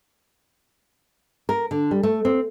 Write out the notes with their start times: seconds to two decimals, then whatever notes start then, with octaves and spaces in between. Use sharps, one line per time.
1.49 A#4
1.71 D3
1.91 G3
2.03 A3
2.25 C4